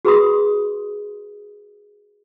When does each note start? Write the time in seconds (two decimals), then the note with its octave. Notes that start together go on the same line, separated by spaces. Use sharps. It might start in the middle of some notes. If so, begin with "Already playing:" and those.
0.05 F#4 G#4 B4 B5 C6 D#6